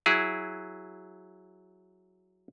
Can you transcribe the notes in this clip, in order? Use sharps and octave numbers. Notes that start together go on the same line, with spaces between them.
F#3 E4 G#4